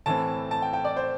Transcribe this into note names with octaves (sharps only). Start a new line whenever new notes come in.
A2 E3 C4 A5
A5
G5
G5
D5
C5